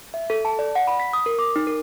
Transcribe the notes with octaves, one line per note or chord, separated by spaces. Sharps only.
E5
A4
A5
D5
F#5
B5
B6
D#6
A#4
D6
D#4
A#4